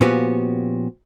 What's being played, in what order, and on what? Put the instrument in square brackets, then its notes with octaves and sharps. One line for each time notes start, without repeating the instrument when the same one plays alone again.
[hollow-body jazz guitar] A#2 F3 B3 C#4 F#4 G4